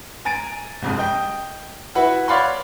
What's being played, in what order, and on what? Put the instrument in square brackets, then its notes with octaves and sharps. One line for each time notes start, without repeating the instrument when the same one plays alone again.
[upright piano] G#5 A#5 A6 D7
C2 F2 G#2
D#5 G5
E4 F#4 B4 E5 F#5
C#5 D5 F5 F#5 B5 C6